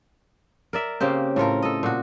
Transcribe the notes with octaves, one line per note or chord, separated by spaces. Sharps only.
A#4 D5 E5
C#3 A#3 C4 G4
A2 A3 F4 A#4
A4 D#5
A#2 F#4